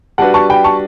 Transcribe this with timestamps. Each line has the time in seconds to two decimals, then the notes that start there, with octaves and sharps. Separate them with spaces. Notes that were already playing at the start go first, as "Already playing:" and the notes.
0.18 G3 D4 F#4 B4 F#5 A5
0.34 A5 C#6
0.50 G5 B5
0.64 A5 C#6